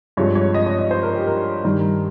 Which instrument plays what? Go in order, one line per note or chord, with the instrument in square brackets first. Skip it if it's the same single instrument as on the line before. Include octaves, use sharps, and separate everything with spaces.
[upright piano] G2 F3 G#3 C4 C#5
C#5
D#5
C#5
D#5
C5
A#4
G4
A#4
G2 D#3 G3